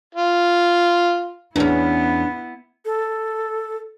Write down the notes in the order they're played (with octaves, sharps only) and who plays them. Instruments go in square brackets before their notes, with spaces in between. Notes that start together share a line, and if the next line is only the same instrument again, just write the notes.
[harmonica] F4
[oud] E2 C#4 [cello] B3 E4 [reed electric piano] D4
[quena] A4